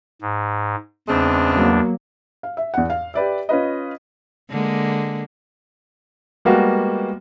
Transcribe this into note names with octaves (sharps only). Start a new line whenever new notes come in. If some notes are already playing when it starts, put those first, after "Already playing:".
G#2
E2 C#3 G#3 C4 D4
F#3 A#3
F5
E5
E2 F#5
F5
G4 B4 D5 E5
C#4 F4 B4 D#5
D3 G#3 A#3
G3 G#3 A#3 B3 F#4